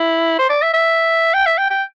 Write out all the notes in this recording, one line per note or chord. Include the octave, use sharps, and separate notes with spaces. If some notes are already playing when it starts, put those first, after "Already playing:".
Already playing: E4
C5
D5
E5
E5
G5
E5
G5
G5